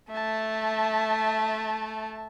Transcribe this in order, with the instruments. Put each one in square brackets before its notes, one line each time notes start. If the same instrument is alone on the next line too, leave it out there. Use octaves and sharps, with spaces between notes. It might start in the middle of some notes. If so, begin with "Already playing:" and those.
[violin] A3 [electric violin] E5 A5